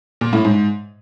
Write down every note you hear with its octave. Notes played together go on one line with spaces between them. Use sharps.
A#2
A2
G#2